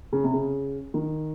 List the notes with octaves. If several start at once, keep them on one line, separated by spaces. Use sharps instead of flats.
C#3
C3
C#3
D#3